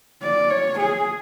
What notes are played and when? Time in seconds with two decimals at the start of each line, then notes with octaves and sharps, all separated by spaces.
0.22 D5
0.50 C#5
0.79 G#4